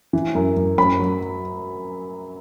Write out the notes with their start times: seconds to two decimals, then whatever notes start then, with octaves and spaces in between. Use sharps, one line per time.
0.13 E3
0.35 F#2
0.57 F#2
0.78 F#2 B5
0.99 F#3